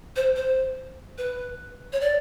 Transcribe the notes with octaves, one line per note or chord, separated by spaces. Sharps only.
C5
C5
B4
C#5
D5